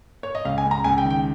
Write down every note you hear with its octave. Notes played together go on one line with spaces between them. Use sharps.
C#5
D#5
C#2 F5
G#5
C#2
A#5
C#2 G#5
G5
D#3
G5